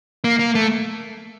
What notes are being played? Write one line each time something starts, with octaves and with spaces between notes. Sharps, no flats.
A#3
A#3
A3